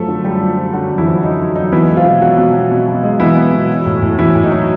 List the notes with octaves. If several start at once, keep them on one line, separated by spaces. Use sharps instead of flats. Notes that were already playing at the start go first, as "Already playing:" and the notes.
Already playing: F#2 F3 A3 A4
D3
F#2 G3 G4
F3
F3
D3 F#3 F#4
F#2
E3 E4
F3
F#2 D#4
F#2
F#2 D#4
E3 B3 E4
G#3
F3 F4
B2
B2 F#3 F#4
B2
B2
B2
B2
G#3
E3 B3 E4
B3
B2
F#3
A2
A2
E3 F#3 E4
A2
D#4
F#3